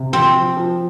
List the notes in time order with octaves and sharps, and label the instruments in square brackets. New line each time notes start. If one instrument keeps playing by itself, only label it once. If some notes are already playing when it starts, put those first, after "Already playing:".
Already playing: [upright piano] C3
[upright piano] F3 [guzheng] C4
[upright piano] F3
F3